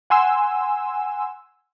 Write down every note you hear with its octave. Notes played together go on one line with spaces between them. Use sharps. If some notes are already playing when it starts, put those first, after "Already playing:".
F#5 G#5 C6 E6